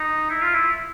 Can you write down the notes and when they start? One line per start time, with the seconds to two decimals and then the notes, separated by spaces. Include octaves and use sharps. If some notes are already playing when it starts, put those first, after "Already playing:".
Already playing: D#4
0.30 E4
0.42 F4
0.54 E4